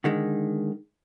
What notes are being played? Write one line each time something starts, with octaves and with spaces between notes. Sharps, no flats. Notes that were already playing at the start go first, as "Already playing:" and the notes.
D3 D#3 G#3